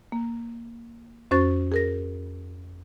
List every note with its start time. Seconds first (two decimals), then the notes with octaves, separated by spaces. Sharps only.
0.12 A#3
1.31 F2 C#4 F#4 C5 C#6 A6
1.72 G#4 A#4 A#6